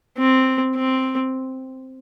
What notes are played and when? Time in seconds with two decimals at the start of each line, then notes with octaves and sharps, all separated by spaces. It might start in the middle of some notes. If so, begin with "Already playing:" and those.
0.18 C4
0.76 C4